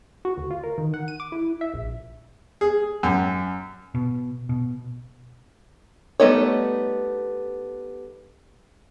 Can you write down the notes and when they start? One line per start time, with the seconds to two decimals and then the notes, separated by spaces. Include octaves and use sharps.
0.25 F#4
0.37 D2
0.51 F4
0.64 A#4
0.78 D#3
0.94 F#5
1.08 D#7
1.20 D6
1.32 E4
1.61 E5
1.74 A#1
2.61 G#4
3.03 F#2
3.95 B2
4.49 B2
6.20 G3 A3 B3 D#4 C#5